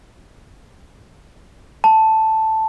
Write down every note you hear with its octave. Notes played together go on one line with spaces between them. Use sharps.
A5